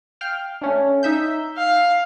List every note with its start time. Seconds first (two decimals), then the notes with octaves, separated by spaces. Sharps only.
0.21 F5 G5 F6
0.61 A3 C#4 D4
1.03 D#4 E5 G6
1.57 F5